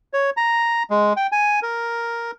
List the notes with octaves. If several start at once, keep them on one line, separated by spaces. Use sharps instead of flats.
C#5
A#5
G#3
G5
G#5
A#4